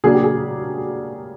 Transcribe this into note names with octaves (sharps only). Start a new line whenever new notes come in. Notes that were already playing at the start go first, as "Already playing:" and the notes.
C#3 F#3 A#3 D4 G#4
G4
G#4